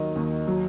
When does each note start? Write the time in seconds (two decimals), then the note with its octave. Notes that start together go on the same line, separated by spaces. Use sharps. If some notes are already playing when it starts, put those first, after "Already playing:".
Already playing: D#2 D#3 F#3 D#5
0.16 D#2
0.47 F#3